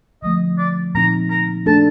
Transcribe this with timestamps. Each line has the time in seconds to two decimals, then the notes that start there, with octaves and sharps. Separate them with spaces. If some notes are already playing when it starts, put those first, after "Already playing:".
0.23 D3 F3 A3 D#5
0.58 D5
0.95 A#2 F3 C4 D#4 A#5
1.30 A#5
1.66 A3 D4 A4 A5